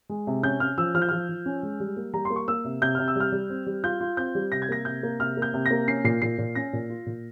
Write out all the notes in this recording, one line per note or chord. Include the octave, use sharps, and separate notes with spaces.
G#3
C3
C#4 G6
C#4 F6
F3 E6
F3 F6
G6
F3 F6
F3
C#4
G#3
G3
A#3
G3 A#5
C6
A#3
C#6
A#3 E6
C3
C3 G6
C3 F6
E6
G3 F6
G3
C4
G3
F4 G6
F4
C4 G6
G3
C3 A#6
G#6
A#3 A#6
C3 G6
A#3
C3 F6
A#3
G6
C3
A#6
A#3
C#4 C7
A#2 C7
A#2 C7
A#2
C#4 A#6
A#2
F4
A#2